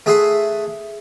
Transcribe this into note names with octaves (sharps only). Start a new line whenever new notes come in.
A3 G#4 E5 F#5 G#5 C6